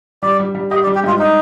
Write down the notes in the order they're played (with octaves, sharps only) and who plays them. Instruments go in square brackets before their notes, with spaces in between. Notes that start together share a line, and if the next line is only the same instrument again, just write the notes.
[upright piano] G3 [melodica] D5
[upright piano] G3
G3
[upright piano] G4 [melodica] D#5
[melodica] D5
[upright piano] G3
[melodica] G4
[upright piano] G#2 [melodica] F4
[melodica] D#4